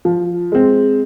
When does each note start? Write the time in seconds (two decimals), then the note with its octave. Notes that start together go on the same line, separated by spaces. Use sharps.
0.05 F3
0.52 G#3 C4